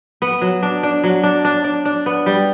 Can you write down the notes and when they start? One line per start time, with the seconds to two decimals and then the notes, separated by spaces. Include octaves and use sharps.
0.22 B3
0.41 F#3
0.63 D4
0.83 D4
1.04 F#3
1.23 D4
1.45 D4
1.64 D4
1.85 D4
2.06 B3
2.26 G3